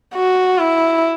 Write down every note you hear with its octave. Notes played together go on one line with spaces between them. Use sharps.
F#4
E4